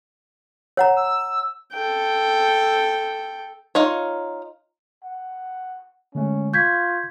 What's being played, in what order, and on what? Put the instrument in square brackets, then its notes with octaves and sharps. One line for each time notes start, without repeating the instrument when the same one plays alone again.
[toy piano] C#5 F#5 A#5
[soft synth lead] E6
[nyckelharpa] A4 G5
[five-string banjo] D#4 F4 C#5
[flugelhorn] F#5
[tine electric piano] D3 G#3 A3 [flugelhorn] C#4
[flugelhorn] F4 [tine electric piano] C#6 [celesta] G6 G#6 B6